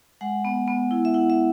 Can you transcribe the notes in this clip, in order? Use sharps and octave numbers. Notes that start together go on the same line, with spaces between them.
G#3 F#5
B3
B3
E4
E5
E4 F#5
E5